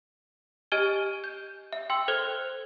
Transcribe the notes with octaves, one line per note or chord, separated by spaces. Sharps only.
G4 D#5 G#5 F6 G#6 G7
G6
E5
G5 C6 E6
A4 C5 F6 G#6 G7